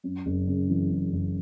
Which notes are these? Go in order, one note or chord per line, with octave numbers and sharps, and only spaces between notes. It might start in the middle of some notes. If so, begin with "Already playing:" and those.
F#2
F#1
C#3
E3
F#2
F#1